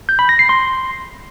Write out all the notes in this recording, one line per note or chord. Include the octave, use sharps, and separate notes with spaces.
G6
B5
A#6
C7
C6